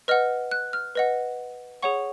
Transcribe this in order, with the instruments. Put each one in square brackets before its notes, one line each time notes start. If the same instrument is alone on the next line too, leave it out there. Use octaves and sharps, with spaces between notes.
[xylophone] B4 D#5 F#5 F6
F#6
F6
B4 D#5 F#5
G#4 C#5 F#5 C#6